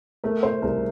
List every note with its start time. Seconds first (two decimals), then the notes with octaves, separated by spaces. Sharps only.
0.24 A3 A#4
0.43 C5
0.62 C2 A#4